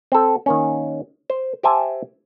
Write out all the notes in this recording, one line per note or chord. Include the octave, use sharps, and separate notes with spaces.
C4 A4
D#3 A#3 C#4
C5
G4 C5 E5 G#5 A5